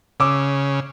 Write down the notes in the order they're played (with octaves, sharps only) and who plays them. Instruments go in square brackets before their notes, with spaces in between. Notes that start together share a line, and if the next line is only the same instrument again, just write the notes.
[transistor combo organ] C#3 [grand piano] D6 E6